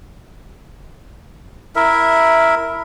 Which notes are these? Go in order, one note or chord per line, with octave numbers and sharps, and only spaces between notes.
E4 A#4 E5